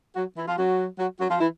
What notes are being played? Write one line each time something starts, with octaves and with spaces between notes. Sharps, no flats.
F#3 F#4
E3 E4
F3 F4
F#3 F#4
F#3 F#4
F#3 F#4
F3 F4
E3 E4